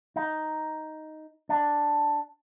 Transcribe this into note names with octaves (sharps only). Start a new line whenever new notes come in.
D#4
D4